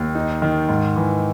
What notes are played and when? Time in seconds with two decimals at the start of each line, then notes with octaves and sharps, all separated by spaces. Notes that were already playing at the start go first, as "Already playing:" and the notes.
Already playing: D#2
0.15 D#4
0.42 D#3
0.69 G#2
0.96 E3